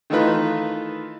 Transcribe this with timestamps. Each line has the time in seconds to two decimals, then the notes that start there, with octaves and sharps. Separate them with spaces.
0.10 D#3 E3 A3 D#4 F4 B4